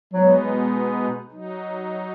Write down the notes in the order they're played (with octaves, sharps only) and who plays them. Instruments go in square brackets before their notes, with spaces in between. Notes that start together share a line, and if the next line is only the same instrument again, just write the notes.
[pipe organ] B2 G#3 B3 D#4 [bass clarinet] F#3
[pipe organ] F#3 D#4